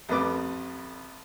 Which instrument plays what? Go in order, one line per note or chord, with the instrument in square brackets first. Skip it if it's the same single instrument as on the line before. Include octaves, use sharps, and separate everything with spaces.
[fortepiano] A1 F2 B4 D6